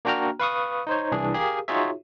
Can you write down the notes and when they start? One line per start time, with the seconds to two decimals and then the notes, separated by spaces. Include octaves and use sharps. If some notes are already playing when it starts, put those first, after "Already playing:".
0.05 A#3 D4 F#4 G5 A#5 F6
0.40 B4 F5 C#6 D#6
0.87 D#4 C5 C#5
1.12 C2 E3 D4 G#4
1.34 G4 G#4 A#4 F5
1.68 D#4 F4 F#4 G#4 C#5 E5